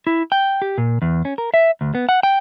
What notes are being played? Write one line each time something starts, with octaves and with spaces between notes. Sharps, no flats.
E4
G5
G4
A#2
E2
C#4
A#4
E5
D2
B3
F#5
G5